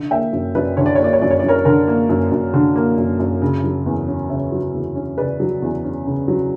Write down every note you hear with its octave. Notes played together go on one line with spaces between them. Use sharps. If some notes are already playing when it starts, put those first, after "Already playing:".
Already playing: D3
A#3 E5 G5
F#2
F#2 B4 D5
D3 C#5
D5
A#3 C#5
D5
C#5
F#2 D5
C#5
F#2 D5
A#4 C#5
D3 A#4
A#3
F#2
F#2
D3
A#3
F#2
F#2
C#3
F#3
E2
C#4
C#3 C#5 E5
F#3
E2
C#4
C#3 B4 D5
F#3
E2
C#4
C#3
F#3